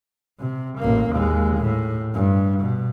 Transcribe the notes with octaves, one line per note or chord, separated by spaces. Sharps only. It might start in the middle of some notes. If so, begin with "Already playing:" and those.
C3
A1 A#3
D#2 G#3
A2
G2
B2